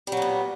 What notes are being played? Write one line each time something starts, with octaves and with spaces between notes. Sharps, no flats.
A#2 F#3 G3 B3